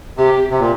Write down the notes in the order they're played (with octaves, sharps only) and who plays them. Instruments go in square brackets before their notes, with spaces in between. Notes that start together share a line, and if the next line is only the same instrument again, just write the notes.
[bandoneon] C3 [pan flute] G4
[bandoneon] C3
A#2